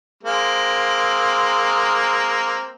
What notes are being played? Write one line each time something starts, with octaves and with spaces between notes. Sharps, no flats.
G#3 A#3 C4